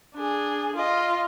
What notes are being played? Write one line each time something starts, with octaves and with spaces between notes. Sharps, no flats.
D4 G#4
F4 D#5